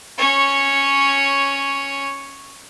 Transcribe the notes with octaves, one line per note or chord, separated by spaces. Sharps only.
C#4 C#5